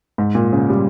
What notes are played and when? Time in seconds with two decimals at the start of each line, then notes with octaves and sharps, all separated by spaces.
0.18 G#2
0.35 A#2
0.53 C#3
0.70 G3